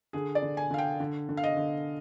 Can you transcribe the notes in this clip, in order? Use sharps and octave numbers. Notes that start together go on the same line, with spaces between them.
D3 G#4
D5
D3
G#5
D3 F5
G5
D3
D3
F5
D#5
D3